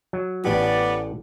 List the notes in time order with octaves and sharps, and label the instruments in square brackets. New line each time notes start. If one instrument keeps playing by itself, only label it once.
[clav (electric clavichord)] F#3
[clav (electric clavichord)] A1 A2 G4 [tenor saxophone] B3 [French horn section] D5